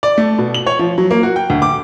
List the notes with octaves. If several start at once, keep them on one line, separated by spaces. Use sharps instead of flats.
D5
A3
B2
F#7
C#5
F3
F#3
A#3
F#4
G5
D2
D6